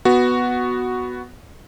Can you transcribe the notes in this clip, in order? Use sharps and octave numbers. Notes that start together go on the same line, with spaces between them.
B3 F#4